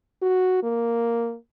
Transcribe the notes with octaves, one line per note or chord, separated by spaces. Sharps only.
F#4
A#3